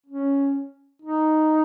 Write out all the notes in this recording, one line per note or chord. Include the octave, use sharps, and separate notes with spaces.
C#4
D#4